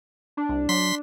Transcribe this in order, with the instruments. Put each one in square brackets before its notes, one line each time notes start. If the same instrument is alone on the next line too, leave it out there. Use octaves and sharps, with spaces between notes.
[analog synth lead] D4
[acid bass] C2
[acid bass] F#3 [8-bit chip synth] C6 B6